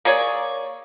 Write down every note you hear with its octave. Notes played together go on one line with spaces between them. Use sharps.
A#3 G#4 C#5 D5